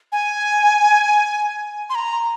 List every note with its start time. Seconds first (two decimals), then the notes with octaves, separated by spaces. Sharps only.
0.12 G#5
1.90 C6
1.95 A#5